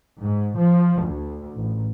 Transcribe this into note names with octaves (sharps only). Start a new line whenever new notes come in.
G#2
F3
D2
A1